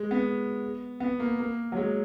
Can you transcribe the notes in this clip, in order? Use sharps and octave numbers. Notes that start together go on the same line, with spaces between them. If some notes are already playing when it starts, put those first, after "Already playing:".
Already playing: G#3
B3
B3
A#3
A#3
F#3
G#3